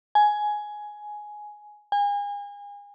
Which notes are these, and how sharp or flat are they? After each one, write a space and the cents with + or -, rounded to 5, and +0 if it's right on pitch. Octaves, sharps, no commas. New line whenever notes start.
G#5 +10
G#5 -35